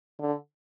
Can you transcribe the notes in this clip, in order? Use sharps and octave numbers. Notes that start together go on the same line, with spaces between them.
D3